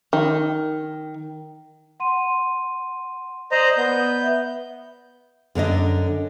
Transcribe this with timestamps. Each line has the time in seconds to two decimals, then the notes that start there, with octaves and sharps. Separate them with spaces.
0.13 D#3
2.00 F#5 C6 D#7
3.52 C5 D5 D#5 A#5 D#6 F#7
3.78 B3 G6
4.23 E5
5.55 F#2 D3 D4 D#5